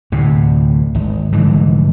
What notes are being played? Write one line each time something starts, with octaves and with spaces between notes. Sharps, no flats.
D2 A2 C3
G#1
F1 G#2 D3 E3